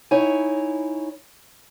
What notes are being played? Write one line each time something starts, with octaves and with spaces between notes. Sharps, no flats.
D#4 E4 C#5 G#5